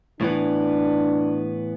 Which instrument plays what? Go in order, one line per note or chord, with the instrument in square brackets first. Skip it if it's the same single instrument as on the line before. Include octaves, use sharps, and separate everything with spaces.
[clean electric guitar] A2 E3 B3 [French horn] D4